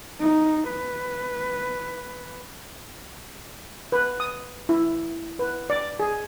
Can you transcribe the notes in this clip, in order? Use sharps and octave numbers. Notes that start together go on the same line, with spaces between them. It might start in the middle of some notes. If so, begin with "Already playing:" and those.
D#4
B4
B4
D#6
E4
B4
D5
G#4